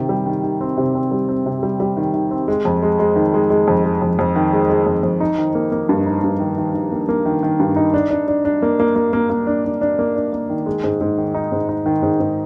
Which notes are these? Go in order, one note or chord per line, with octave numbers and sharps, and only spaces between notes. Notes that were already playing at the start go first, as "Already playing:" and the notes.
Already playing: C3 D#3
G3
D#3
D#3
C4
C3
C4
G3
C4
C3
G3
G3
D#3
D#3
C4
G#3
F2
G#3
G#3
D#3
G#3
G#3
F2
G#3
F2
F2
D#3
G#3
G#3
F2
F2
D#4
D#3
A#3
A#3
G2
D#4
G2
D#3
D#3
D#3
A#3
A#3
D#3
D#3
G2
D#4
D4
D4
D4
D4
A#3
A#3
A#3
A#3
A#3
D4
D4
D4
A#3
D4
A#3
D#3
G#3
G#2
G#2
D#3
D#4
G#2
D#4
D#3
G#2
G#2